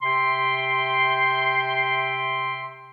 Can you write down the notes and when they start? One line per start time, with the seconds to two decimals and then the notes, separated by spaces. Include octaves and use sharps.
0.03 C3 E5 G5 C6